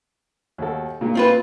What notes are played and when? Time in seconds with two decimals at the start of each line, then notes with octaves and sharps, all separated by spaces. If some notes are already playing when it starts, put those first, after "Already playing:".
0.58 D#2 F#4 A4
1.01 A#2 G#3 A#3
1.15 C4 F4 B4